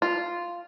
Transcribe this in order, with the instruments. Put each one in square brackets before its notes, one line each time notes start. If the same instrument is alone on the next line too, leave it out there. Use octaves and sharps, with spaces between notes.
[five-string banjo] F4